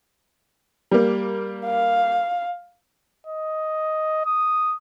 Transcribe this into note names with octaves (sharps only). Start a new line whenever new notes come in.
G3 A#3
F5
D#5
D#6